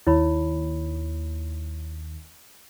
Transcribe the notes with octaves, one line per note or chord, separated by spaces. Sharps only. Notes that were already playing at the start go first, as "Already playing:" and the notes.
D#2 E4 C#5 B5